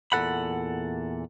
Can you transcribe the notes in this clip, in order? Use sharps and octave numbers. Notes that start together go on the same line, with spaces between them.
E2 A#2 E3 A4 F#5 B5